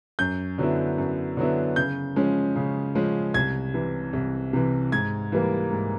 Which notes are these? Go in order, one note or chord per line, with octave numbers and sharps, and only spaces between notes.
F#2 G6
D3 F#3 B3 E4
F#2
D3 F#3 B3 E4
C#3 G6
F3 G#3 C#4
C#3
F3 G#3 C#4
C2 G#6
C3 E3
C2
C3 E3
G#2 G#6
E3 G3 A#3
G#2